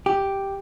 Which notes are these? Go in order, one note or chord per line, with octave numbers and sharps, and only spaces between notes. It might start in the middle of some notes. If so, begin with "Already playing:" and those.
G4